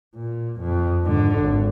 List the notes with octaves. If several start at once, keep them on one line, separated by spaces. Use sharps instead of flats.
A#2
F2
G#2 D3
G#1